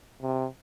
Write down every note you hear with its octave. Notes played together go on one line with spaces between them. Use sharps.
C3